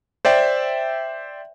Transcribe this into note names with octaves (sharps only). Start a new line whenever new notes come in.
C5 D5 E5 G5